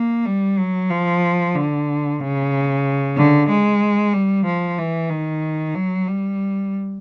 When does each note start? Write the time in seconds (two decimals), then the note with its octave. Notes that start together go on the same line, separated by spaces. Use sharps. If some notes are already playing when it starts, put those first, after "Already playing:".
Already playing: A#3
0.26 G3
0.59 F#3
0.91 F3
1.55 D3
2.20 C#3
3.17 D3
3.49 G#3
4.13 G3
4.46 F3
4.79 E3
5.10 D#3
5.75 F#3
6.08 G3